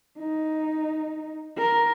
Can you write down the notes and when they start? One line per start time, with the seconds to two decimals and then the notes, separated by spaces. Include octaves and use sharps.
0.19 D#4
1.57 A#4